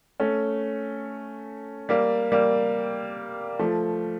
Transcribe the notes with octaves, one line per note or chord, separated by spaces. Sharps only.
A3 C#4
G3 A#3
G3 A#3
F3 A3